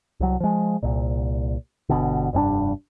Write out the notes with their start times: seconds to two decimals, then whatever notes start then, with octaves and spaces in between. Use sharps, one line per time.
0.20 C2 F#3
0.40 F3 G#3
0.83 C2 A#2
1.89 G1 B2 D3
2.33 F1 G2 C#4 D4